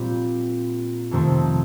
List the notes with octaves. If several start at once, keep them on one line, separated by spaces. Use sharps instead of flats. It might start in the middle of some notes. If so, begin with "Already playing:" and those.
Already playing: A#2 G3 C4 G4 D5
F2 C3 D#3 A3 C4